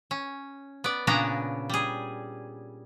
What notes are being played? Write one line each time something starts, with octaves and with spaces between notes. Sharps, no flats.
C#4
B3 D5
A#2 C#3 B3 C#4 D4 A#5
G3 G#4